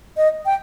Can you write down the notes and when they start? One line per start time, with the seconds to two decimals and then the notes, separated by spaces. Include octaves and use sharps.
0.17 D#5
0.46 G5